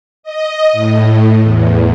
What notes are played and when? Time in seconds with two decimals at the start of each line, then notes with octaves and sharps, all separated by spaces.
0.23 D#5
0.73 A2
1.42 E2